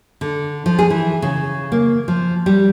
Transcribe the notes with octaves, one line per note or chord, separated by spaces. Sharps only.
D3
F3
G#4
E3
C#3
A#3
F3
G3